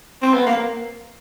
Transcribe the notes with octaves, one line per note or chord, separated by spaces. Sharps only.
C4
B3
A#3